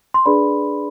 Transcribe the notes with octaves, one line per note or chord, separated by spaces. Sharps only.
C6
D4 G#4 B4 D5 B5